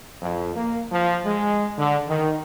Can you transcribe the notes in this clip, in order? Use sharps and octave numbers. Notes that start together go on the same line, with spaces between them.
F2
A#3
F3
G#3
D3
D#3